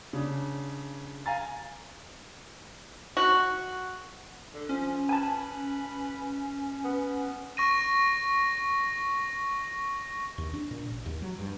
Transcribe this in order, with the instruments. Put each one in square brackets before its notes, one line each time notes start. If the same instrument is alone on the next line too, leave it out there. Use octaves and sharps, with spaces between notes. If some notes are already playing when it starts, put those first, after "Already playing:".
[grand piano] C#3 D4
F5 G#5 A#5 A6
[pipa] F#4
[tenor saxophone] D3
[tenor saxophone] F3 [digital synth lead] C#4
[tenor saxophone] B4 [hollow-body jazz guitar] G#5 A5
[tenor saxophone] B3
[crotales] C#6 A#6 D#7
[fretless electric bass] D#2
D4
A#2
A1
D#2
F#3
G2